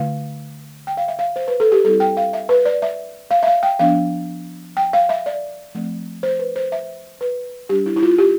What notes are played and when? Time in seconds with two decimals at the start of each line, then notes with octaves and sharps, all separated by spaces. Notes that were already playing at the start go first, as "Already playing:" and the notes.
Already playing: D3 A3 E4 F5
0.87 G5
0.97 F5
1.08 E5
1.19 F5
1.36 C5
1.48 B4
1.60 A4
1.72 G4
1.84 G3 C4 E4 A4
2.00 G5
2.17 F5
2.33 E5
2.49 B4
2.65 D5
2.82 E5
3.31 F5
3.43 E5
3.47 F5
3.63 G5
3.79 F3 B3 D4 F5
4.77 G5
4.93 F5
5.09 E5
5.26 D5
5.75 F3 A3 C4
6.23 C5
6.39 B4
6.56 C5
6.72 E5
7.21 B4
7.69 G3 D4 G4
7.86 E4
7.96 E4
8.02 F4
8.18 G4